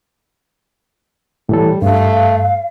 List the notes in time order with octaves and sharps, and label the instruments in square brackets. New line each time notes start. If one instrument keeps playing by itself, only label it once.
[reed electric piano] A2 E3 A4 [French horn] G3
[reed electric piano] G2 [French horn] A3 [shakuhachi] F5